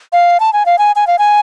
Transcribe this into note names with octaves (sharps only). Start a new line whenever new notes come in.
F5
A5
G#5
F5
G#5
G#5
F5
G#5